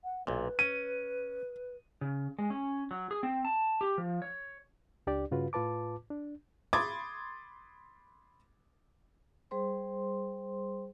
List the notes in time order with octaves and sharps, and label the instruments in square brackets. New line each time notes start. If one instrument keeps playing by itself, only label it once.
[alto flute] F#5
[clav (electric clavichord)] B1 A#2 [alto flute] B4
[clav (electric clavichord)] C#4 [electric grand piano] D#7
[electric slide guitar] C#3
G#3
C#4
F#3
G#4
C4
A5
G4
F3
C#5
[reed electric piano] C#2 D4 G4 D5
G2 C#3 F4 F#4 B4
A2 F4 B4 A5 D6
D4
[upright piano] B5 C6 D6 D#6 G#6 A6
[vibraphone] G3 G#4 C5 C6